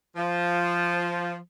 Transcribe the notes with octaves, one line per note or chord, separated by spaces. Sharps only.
F3